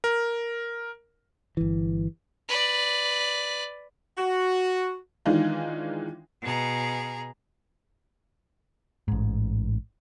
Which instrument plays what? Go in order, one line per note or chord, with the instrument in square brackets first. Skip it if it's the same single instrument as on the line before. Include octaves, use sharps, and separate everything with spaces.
[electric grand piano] A#4
[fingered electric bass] G1 E3
[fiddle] B4 D5
[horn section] F#4
[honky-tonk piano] D#3 E3 G#3 D4 D#4 F4
[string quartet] B2 G#4 A#5
[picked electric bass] A1 G#2